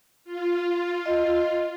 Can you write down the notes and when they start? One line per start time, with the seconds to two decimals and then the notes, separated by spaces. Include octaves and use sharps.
0.25 F4
1.06 D#5